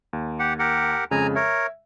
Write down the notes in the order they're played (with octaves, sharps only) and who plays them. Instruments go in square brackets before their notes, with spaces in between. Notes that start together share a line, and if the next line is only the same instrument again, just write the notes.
[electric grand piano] D#2
[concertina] G4 F#5
G4 A#4 F#5
[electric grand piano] F2 C#3 G#3 [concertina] G#5 A#5
[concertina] A#4 C#5 [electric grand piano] E5